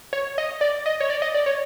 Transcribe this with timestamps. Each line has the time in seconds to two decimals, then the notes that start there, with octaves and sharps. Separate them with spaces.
0.13 C#5
0.38 D#5
0.61 D5
0.86 D#5
1.00 C#5
1.10 D5
1.22 D#5
1.34 D5
1.46 C#5